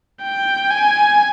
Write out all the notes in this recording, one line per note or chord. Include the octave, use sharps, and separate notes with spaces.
G5
G#5